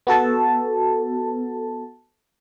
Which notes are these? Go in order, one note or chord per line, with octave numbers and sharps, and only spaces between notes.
B3 F#4 A4 A5